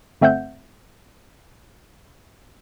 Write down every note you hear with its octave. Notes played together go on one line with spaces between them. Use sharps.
G1 A3 C4 E5 F#5 G6